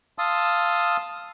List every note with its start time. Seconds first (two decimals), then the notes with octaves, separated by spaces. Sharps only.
0.18 F5 A5 C6 D#6 E6